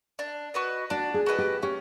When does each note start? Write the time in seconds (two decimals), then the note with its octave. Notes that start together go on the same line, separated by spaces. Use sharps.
0.19 D4
0.54 F#4 B4 D#5
0.90 D4 F#4
1.14 G#4
1.26 F#4 B4 D#5
1.38 G4
1.63 C#4 G4